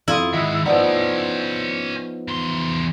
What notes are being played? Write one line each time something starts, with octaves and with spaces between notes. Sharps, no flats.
F2 E4 F4 D#6
D#3 G#3 D#5 E5 F#5
F3 B3 C#4 D#4 D5 F#5 G5
E2 C6